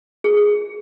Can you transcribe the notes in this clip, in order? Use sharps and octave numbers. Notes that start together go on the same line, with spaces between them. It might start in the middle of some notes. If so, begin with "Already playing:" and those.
G#4